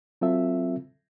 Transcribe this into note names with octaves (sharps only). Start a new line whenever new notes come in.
F#3 C4 F4 A4 E5